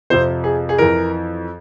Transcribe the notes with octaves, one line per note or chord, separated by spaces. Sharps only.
F2 C3 F3 C5
G#4
G#4
F2 E3 A#4